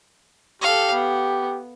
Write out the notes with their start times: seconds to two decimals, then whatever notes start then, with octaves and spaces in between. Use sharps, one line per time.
0.62 G4 A4 F5
0.92 B3